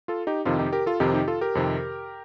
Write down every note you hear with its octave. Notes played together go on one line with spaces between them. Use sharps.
F4 A4
D#4 G4
F2 C3 D#3 F4
D#4 G4
G4 A#4
F4 A4
F2 C3 D#3 D#4 G4
D#4 G4
F4 A4
G4 A#4
F2 C3 D#3